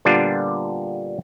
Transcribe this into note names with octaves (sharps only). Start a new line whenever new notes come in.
A#2 D3 G3 B3 D4 F4